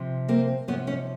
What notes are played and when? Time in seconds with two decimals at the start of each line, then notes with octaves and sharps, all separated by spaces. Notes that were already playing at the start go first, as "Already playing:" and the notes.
Already playing: C3 F3
0.29 A#3 C4
0.68 C3 F3 B3 C#4
0.87 C#4 D#4